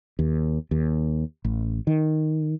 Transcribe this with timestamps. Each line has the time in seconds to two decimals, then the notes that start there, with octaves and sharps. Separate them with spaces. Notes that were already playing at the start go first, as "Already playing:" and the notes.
0.19 D#2
0.71 D#2
1.45 A1
1.87 D#3